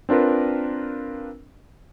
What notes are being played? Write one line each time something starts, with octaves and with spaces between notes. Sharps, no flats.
C4 D4 F4 A#4 B4